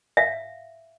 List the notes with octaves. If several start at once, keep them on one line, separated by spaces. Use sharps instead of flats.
E5 F5